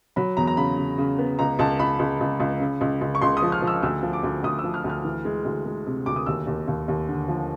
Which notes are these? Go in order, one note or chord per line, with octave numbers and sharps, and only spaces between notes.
F#3 B5
E2 A#5
A#5
C#3 B5
C#3
C#3
B3
C#2 A#5
C#2 A5
C#2 B5
C#2
C#2
C#2
C#3
C#2
C#2
C#6
C#2 C6
D#6
F3
F6
F3
E6
D2 E6
F3
D6
D2
D2 D#6
E6
F3
F6
D2
F6
E3
G#3
D2
G#3
C3
D2 D6
D#6
D#2 E6
D#2
D#2
D#2
D3
F3